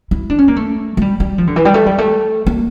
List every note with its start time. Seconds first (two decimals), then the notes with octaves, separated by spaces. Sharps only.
0.11 E4
0.30 D4
0.39 C#4
0.48 A#3
0.56 A3
0.97 A3
1.01 G3
1.20 G3
1.38 F3
1.47 D3
1.56 E3
1.65 G3
1.74 A3
1.86 G3
1.98 A3
2.47 A#3